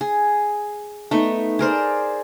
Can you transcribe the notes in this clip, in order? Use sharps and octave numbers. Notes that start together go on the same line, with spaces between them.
G#4
A3 B3 D#4
G#4 A#4 C5 D5